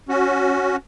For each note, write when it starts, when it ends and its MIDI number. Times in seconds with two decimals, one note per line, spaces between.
0.09 0.76 61
0.09 0.76 66